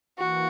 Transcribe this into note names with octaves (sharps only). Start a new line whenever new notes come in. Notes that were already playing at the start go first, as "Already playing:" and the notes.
E3 A#3 F#4